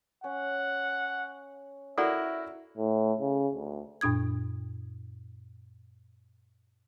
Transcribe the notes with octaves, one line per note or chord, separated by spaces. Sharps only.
C#4 F#5
E4 F#4 A4 A#4 D5 E5 F#5
A2
C#3
D2
F#2 A#2 D4 D#6 G#6